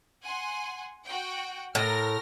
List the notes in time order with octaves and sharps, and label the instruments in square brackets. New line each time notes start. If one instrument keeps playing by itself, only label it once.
[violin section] F#5 G#5 C6
F#4 F#5 G5
[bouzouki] A2 [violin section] A#4 F6 A#6